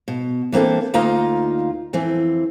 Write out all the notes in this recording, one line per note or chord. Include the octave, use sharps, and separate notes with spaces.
B2
E3 A#3 C4 D4 A4
D2 A#3 D#4 F4 D#5 A#5
F2 E3 C4